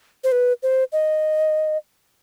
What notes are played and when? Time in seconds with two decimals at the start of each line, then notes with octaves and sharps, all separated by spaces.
0.24 C5
0.32 B4
0.63 C5
0.92 D#5